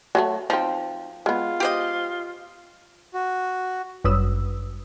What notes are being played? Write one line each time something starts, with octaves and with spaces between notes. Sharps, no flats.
F#3 G#3 A3
F3 C4 D#4
G#3 B3 F4
G4 C5 D#5
F#4
G1 F#2 B4 D#6 E6